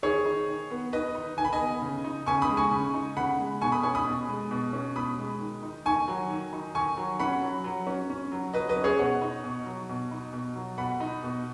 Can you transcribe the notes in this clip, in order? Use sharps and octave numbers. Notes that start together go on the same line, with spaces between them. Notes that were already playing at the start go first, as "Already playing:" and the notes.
D#3 G#4 C#5
D#4
D#3
B3
D#3 B4 D#5
D#4
D#3 G#5
B5
D#5 G#5
B3
C#3
D#4
C#3 G#5 C#6
B5 D#6
G#3
G#5 C#6
C#3
D#4
C#3 F#5 B5
G#3
B2 G#5 C#6
B5 D#6
C#4 G#5 C#6
B5 D#6
B2
G#3
B2
C#4
B2 B5 D#6
G#3
D#3
D#4
D#3 G#5 C#6
F#3
D#3
D#4
D#3 G#5 C#6
F#3
C#4 F#5 B5
F#3
F#3
C#4
C#4
F#3
F#3 B4 D#5
B4 D#5
C#4
G#4 C#5
B2 C#5 F#5
D#4
B2
F#3
B2
D#4
B2
F#3
B2 F#5 B5
D#4
B2